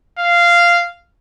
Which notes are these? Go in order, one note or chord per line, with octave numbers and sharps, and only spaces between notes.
F5